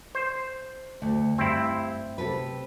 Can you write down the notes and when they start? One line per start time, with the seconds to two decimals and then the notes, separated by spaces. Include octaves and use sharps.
0.15 C5
1.02 D2
1.38 G2 C4 E4
2.18 C3 A4 B4